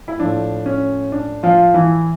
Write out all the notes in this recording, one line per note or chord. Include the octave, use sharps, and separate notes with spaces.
E4
A2 F3 D4
C#4
D4
F3 F4
E3 E4